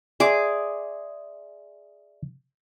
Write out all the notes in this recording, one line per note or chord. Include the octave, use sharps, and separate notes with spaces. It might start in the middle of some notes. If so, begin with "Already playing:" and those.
G#4 D5 E5 C6 D6